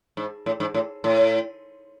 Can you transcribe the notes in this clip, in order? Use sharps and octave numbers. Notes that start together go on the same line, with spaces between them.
G#2
A2
G#2
A2
A2